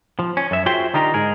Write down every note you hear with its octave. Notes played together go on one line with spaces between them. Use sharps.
F3
C#4
F#2 E5
F4 F#4 G#4 C5 E5 G5
D3 D#4 F4 G4 A#4 A#5
G#2 G#4 A#4